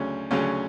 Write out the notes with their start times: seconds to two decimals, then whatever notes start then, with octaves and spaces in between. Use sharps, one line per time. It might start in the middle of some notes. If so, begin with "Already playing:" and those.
Already playing: D2 C#3 F#3 C#4
0.31 D2 C#3 F#3 C#4